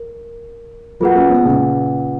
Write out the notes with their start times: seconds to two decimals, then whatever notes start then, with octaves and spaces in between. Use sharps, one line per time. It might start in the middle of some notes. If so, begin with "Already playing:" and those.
Already playing: A#4
1.00 F#3 A#3 F4 G#4 B4 F#5
1.15 A#3 C#4
1.30 G#3 B3
1.45 A#2 C#3